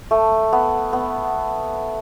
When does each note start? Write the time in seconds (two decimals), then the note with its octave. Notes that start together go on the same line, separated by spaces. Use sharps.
0.11 A3
0.53 B3
0.93 B3